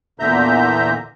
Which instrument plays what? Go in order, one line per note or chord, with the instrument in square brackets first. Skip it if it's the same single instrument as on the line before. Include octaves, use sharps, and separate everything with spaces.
[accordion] E2 A#2 D3 E5 A#5 G6